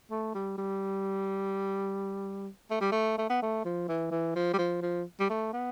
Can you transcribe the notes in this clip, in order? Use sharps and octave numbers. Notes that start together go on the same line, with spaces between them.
A3
G3
G3
A3
G3
A3
A3
B3
A3
F3
E3
E3
F3
G3
F3
F3
G3
A3
B3